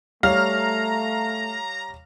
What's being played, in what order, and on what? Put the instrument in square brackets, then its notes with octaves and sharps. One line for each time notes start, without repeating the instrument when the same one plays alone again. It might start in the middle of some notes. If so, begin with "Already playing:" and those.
[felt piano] G3 C#5 [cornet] A3 [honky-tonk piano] F5 F6 [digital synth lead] A#5